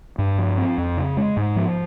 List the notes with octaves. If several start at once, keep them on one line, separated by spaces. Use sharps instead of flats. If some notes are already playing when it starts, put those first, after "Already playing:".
G2
F3
C4
F2
C#3
G#3
G#2
F3